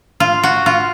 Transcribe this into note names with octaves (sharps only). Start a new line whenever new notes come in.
F4
F#4
F4